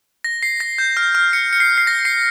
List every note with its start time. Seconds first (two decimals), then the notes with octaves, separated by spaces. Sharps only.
0.24 A#6
0.43 C7
0.60 A#6
0.78 G6
0.97 F6
1.15 F6
1.33 C#7
1.53 C#7
1.60 C7
1.78 C7
1.87 A#6
2.05 C7